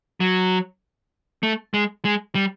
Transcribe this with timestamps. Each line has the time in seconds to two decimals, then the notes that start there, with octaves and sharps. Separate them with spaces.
0.20 F#3
1.43 A3
1.74 G#3
2.05 G#3
2.35 G3